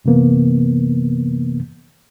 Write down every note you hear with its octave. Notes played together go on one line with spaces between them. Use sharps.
F#2 C3 E3 A#3 B3